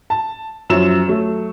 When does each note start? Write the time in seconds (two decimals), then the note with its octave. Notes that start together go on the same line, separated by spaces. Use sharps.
0.10 A5
0.70 F#2 F3 F#3 E4 E7
1.07 F#3 A3